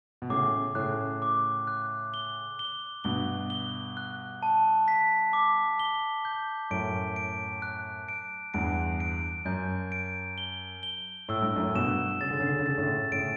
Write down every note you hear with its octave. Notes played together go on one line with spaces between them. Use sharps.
B2
A2 C#3 D6
A2 C#3 F#6
D6
F#6
G7
G7
G2 B2 G7
G7
F#6
A5
B6
D6
G7
G6
F#2 A2 D7
D7
F#6
D7
E2 G2 D7
D7
F#2 G6
D7
G7
G7
A2 E6
G2
F#2 A2
G2 B2 E7
C#3 A6
D3
C#3
D3
C#3
D3 A6
A2 C#3
A2 C#3 D7